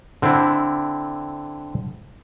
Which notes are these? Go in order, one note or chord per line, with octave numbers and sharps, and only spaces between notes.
D3 C4 D4 E4